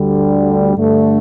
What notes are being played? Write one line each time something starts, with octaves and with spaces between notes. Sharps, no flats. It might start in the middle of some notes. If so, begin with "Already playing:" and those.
Already playing: D2 D3 G3
G2 D3 A3